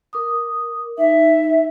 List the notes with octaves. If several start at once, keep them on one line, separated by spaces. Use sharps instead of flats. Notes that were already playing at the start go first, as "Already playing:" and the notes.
A#4 D6 D#6
D#4 E5